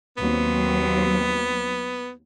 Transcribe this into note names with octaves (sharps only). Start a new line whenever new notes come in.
D#2 F#3 B3 C4